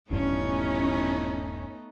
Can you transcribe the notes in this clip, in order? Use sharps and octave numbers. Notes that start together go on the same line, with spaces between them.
D#1 A1 G2 A3 B3 C#4 D#4